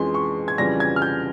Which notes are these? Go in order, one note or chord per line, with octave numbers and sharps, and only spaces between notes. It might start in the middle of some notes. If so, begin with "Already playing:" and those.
Already playing: F2 E3 G#3 C#4 C6
C#6
G#6
F2 C#3 E3 G3 A#6
G#6
F6
G6